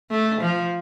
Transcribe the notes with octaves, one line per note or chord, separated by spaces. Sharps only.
A3
F3